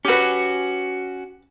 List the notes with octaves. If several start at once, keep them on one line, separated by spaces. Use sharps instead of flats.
C#4 F#4 G4 B4